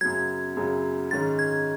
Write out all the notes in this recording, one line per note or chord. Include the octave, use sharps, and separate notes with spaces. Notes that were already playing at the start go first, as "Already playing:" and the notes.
F#2 C#3 F#3 G#6
F#2 C#3 F#3
G#2 D#3 G#3 C#4 A6
G#6